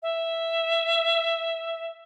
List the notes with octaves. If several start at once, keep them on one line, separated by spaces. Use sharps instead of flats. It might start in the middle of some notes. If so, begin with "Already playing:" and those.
E5